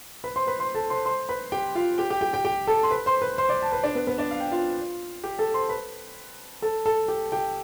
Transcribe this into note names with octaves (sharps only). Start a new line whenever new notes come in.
B4 B5
C5 C6
B4 B5
C5 C6
A4 A5
C5 C6
C5 C6
B4 B5
G4 G5
F4 F5
G4 G5
G4 G5
G4 G5
G4 G5
G4 G5
A4 A5
C6
B4 B5
C5 C6
B4 B5
C5 C6
D5 D6
A5
B4 B5
D4 D5
B3 B4
B3 B4
D4 D5
F5
G5
F4 F5
G4 G5
A4 A5
C5 C6
B4 B5
A4 A5
A4 A5
G4 G5
G4 G5